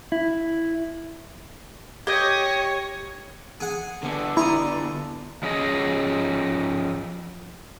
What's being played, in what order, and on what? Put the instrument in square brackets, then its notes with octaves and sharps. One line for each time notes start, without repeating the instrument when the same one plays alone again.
[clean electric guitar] E4
[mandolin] G4 G5 [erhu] C#5 [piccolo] D#5 [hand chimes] G#6
[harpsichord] G#4 F#5
[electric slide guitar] D3 B3 [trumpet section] A4 D5
[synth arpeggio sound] E4 [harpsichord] A#5 C6 D#6
[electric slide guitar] F3 C#4 G#4 D#5